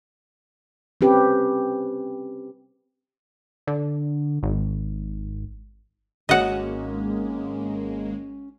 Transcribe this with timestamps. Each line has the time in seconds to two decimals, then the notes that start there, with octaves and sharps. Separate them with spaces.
1.01 C4 C#4 G4 B4
3.67 D3
4.43 G#1
6.29 G#1 G#3 A#3 C#4 F#4 C#5 D#5 F#5